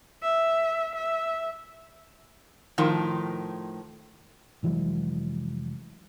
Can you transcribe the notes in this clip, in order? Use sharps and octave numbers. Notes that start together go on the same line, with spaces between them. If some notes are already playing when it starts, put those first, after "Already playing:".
E5
E5
A2 D#3 F3
F1 E3 F#3 G#3